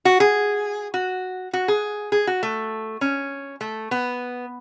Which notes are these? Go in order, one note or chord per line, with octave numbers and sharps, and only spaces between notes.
F#4
G#4
F#4
F#4
G#4
G#4
F#4
A3
C#4
A3
B3